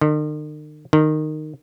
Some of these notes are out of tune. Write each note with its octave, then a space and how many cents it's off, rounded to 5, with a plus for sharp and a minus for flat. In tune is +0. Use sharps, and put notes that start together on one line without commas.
D#3 -45
D#3 -15